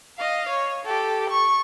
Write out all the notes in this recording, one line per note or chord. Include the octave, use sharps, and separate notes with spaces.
D#5 F5
C#5
G4 A4
C#6